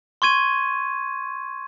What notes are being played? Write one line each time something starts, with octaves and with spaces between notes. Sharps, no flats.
C6 C#6 G#6 D#7